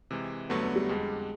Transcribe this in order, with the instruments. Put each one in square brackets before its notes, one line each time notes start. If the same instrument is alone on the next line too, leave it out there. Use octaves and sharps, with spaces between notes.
[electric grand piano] C3 E3 G#3
[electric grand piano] G2 D3 F#3 A3 [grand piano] B3
[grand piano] B3
G3
[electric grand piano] F2 D3 G3 [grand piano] G#3